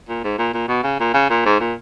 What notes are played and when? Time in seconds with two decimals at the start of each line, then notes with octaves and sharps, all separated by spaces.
0.09 A#2
0.24 G#2
0.39 A#2
0.54 A#2
0.68 B2
0.84 C#3
1.00 A#2
1.14 C#3
1.30 A#2
1.45 G#2
1.60 A#2